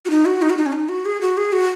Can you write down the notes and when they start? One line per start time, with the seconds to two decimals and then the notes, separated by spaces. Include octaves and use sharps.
0.05 F#4
0.10 D#4
0.25 F#4
0.42 D#4
0.50 F#4
0.57 D#4
0.66 C#4
0.72 D#4
0.89 F#4
1.05 G#4
1.21 F#4
1.37 G#4
1.52 F#4